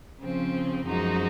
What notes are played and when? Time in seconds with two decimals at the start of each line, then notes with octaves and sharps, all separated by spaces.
0.20 C#3 F3 C4
0.84 F#2 F3 G#3 D#4 F#4